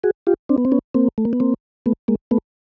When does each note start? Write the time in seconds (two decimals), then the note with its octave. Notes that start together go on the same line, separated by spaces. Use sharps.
0.04 F#4 G#4
0.27 F4 G4
0.49 C4 D4
0.58 B3
0.65 C4
0.72 B3 C#4
0.94 A#3 C4
1.18 A3
1.25 A#3
1.33 B3
1.40 A#3 C4
1.86 A3 B3
2.08 G#3 A#3
2.31 A3 B3